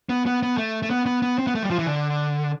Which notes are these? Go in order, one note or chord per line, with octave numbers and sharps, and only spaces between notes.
B3
B3
B3
A3
A3
B3
B3
B3
C4
B3
A3
G3
F3
E3
D3